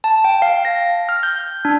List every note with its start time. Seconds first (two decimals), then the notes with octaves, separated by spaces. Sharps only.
0.04 A5
0.24 G5
0.42 F5
0.65 A#6
1.09 F6
1.23 G6
1.65 D4